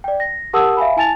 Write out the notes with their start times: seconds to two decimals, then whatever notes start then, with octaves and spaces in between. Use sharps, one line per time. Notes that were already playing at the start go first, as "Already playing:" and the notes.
0.04 D5 G5
0.20 A#6
0.53 G4 A#4 F#5 A5 D#6 E6
0.77 E5 F5 G#5 B5
0.97 E4 G#5 A5 A6 F7